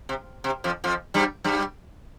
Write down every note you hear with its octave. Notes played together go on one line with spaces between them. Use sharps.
C3
C3
F2 F3
F2 F3
G2 G3
G2 G3